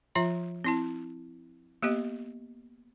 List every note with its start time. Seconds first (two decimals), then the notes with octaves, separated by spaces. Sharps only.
0.15 F3 F4 E5 A#5
0.64 C4 E4 A5
1.82 A#3 B3 G4 D#5